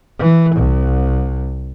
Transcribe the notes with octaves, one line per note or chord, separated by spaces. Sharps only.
E3
C2